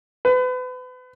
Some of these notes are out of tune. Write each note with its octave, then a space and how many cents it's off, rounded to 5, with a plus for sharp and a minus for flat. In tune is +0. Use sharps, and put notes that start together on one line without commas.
B4 +35